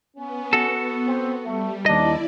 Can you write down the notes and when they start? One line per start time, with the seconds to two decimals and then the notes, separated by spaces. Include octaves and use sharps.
0.15 B3 C#4
0.53 F#4 A4
1.06 C4
1.44 G3 A3
1.86 D#2 D4 E4 D5 D#5